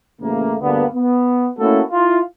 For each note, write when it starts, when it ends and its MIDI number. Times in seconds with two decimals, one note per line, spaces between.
0.22 0.55 33
0.22 0.55 49
0.22 0.55 57
0.22 0.55 58
0.61 0.84 38
0.61 0.84 43
0.61 0.84 50
0.61 0.84 58
0.61 0.84 59
0.95 1.49 59
1.59 1.81 57
1.59 1.81 58
1.59 1.81 61
1.59 1.81 64
1.59 1.81 66
1.59 1.81 69
1.92 2.19 64
1.92 2.19 65